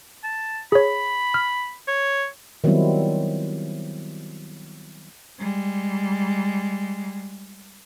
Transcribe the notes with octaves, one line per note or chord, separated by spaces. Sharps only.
A5
G#4 C#5 B5
F6
C#5
D#3 F#3 G3 B3 C4 E4
G3 G#3